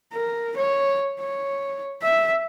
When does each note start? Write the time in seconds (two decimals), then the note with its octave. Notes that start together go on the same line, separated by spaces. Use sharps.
0.13 A#4
0.57 C#5
1.20 C#5
2.02 E5